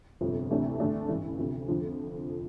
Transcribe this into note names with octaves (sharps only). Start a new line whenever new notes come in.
G1 F2 C3 F3
D2 C3 E3 A3 D4
D2 D3 A3 D4
A1 G2 E3
D2 C3 F3
F2 D3 F3